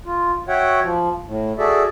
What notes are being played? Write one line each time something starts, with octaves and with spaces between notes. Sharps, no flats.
F4
F#4 C#5 E5 F#5 G5
F3
A2
F#4 G#4 A4 D5 E5